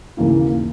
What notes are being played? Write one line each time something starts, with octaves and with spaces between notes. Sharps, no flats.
D#2 C#3 E3 A#3 E4